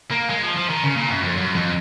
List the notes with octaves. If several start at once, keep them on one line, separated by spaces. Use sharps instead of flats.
A#3
G#3
F3
F3
D#3
C#3
A#2
F#2
F2
F#2
F2